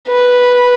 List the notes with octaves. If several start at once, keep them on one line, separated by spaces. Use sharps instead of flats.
B4